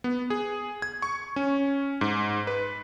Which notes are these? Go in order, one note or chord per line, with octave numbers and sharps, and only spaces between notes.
B3
G#4
G#6
C#6
C#4
G#2
B4